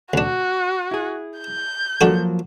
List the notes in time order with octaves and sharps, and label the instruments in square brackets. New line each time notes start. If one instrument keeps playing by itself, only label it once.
[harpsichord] D2 D4 [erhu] F#4
[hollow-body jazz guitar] E4 G#4
[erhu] G6
[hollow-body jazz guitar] F3 F#3 A#3 [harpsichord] D4 F#4 A4